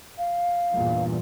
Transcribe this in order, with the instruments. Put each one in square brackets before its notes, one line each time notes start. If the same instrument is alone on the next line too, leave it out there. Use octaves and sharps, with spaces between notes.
[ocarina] F5
[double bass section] E2 G2 A#2